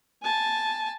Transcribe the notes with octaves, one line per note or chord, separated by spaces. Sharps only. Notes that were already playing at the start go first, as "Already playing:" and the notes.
G#5 A5